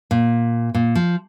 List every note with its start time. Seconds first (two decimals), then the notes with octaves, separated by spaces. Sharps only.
0.11 A#2
0.75 A#2
0.95 F3